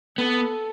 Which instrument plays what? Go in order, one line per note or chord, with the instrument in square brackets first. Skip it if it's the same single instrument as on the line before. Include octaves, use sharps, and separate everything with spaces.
[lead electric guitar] B3 [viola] A4